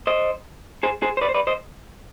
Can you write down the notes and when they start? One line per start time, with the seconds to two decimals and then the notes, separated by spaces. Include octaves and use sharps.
0.07 C5 D#5
0.83 G#4 C5
1.02 G#4 C5
1.17 C5
1.21 B4 D5
1.29 C5
1.34 B4 D5
1.47 C5 D#5